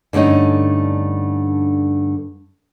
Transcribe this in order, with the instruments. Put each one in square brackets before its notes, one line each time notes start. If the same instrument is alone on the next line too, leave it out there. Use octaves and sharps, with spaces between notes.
[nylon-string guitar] G2 D3 A3 C#4 D#4